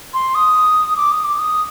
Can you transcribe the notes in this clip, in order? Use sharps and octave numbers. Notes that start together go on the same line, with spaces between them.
C6
D#6
D6
D#6
D6
D#6